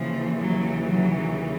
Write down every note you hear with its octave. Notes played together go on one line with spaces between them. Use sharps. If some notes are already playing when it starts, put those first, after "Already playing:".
Already playing: D#2 C#3 E3 F3
F#3
F#3